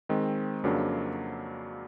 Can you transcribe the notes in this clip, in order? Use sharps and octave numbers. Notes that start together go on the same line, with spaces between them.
D#3 G#3 C4
F2 C#3 F#3 A#3 D4